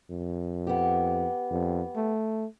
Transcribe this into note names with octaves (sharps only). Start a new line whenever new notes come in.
F2
B3 G4
F2
A3